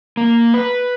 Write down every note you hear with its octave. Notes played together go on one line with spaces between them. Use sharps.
A#3
B4